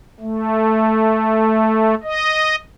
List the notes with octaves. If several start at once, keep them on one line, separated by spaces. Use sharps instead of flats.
A3
D#5